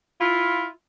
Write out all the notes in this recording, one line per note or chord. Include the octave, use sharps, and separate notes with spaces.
E4 F4